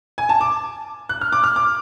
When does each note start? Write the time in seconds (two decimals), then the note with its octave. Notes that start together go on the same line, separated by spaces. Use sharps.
0.18 G#5
0.29 A5
0.41 D6
1.09 F#6
1.21 F6
1.33 D6
1.44 F6
1.56 D6